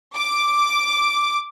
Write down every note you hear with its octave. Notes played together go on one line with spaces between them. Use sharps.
D6